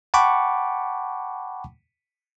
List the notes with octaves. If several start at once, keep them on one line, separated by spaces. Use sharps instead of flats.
F#5 G5 A5 B5 C#6 D6